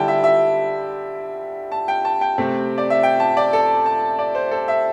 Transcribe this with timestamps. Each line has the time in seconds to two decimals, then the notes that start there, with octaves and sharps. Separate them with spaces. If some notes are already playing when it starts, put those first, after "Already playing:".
Already playing: D3 G3 E4 G5 A5
0.08 E5
0.24 E5
1.72 A5
1.88 G5
2.05 A5
2.21 G5
2.38 C3 A3 C4
2.78 D5
2.90 E5
3.03 G5
3.20 A5
3.37 D5
3.53 A4
3.86 A5
4.19 D5
4.35 C5
4.51 A4
4.68 E5